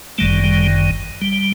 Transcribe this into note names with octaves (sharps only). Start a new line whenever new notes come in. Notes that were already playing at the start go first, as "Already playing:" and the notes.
G1 F#2 D#3 G3 A3
G3
G3